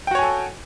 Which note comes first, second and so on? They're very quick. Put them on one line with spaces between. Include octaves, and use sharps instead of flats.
G5 F#4 C#5 G#5 A4